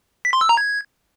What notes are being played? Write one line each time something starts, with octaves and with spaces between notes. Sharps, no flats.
B6
C6
E6
A#5
G#6